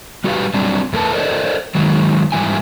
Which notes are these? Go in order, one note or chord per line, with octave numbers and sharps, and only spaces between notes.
G3 F#4 G4 B4 F5
F#3 G3 C4 D4
E2 A3 A#4 B4 A5
A4 A#4 C5 D5 D#5
D#3 F#3 G#3
G#2 E3 G3 E4 G#5